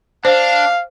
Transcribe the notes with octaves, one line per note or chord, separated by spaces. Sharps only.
D4 C5 F5